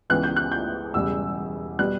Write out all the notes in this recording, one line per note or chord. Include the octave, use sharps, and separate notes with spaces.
C#2 C#3 E3 B3 F#6
G6
F#6
G6
E1 E2 C#3 G3 E6
B2 G3 F#6